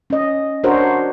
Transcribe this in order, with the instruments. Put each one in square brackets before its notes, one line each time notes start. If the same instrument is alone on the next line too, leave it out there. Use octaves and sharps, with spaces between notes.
[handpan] C#4 D#5
D4 F#4 A#4 C5 C#5